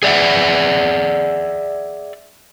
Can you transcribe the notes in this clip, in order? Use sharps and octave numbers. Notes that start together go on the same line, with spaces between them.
G#4 D5 E5 F#5